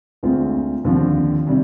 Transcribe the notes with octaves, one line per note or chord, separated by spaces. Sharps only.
D2 D3 G#3 C4 F4
D#2 D3 F3 C4
C3 D#3 G3